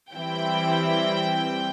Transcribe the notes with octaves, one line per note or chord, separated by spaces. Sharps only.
E3 G3 C4 E4 G5